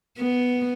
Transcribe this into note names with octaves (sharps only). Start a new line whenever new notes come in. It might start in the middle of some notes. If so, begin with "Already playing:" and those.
B3